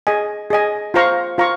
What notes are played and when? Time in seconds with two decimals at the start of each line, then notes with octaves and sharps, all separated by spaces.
0.07 G#4 D#5 G#5
0.50 G#4 D#5 G#5
0.94 F4 C5 F5 A#5 C#6
1.38 F4 C5 F5 A#5 C#6